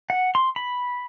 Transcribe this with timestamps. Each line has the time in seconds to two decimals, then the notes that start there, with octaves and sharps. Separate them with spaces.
0.10 F#5
0.35 C6
0.56 B5